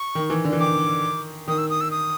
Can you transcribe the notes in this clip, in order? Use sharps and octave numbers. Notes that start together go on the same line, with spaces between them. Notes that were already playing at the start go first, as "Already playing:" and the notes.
Already playing: C#6
D#3
E3
D3
E3
D#3 D6
D#3 D#6
E6
D#6
E6
D#6